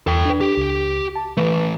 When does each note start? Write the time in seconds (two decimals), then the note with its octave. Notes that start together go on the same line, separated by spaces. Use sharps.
0.07 E2 A4 G5
0.25 D4 B4
0.41 G4
0.57 C#2
1.15 A5
1.37 E3 A3 B4